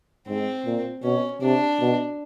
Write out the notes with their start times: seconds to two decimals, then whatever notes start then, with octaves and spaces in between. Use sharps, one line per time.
0.28 G#2 C4
0.65 A#2
1.03 B2 C#4
1.41 C3 D4
1.80 B2